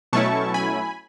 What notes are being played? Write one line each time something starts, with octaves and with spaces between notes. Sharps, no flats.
B2 F#3 A3 C#4 E4 A5 C#6
G#5 B5